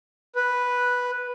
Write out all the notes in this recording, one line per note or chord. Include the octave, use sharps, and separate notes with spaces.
B4